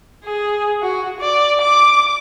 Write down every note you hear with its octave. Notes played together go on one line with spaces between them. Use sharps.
G#4
F#4
D5
D6